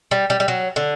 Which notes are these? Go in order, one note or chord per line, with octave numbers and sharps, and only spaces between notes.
G3
G3
G3
F#3
D3